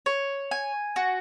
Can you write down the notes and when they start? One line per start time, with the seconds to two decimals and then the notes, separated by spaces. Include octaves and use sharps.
0.06 C#5
0.51 G#5
0.96 F#4